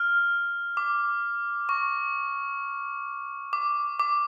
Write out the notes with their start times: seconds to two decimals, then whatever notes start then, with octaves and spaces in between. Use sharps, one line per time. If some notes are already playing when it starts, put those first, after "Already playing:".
Already playing: F6
0.77 D6
1.69 C#6
3.53 D6
3.99 D6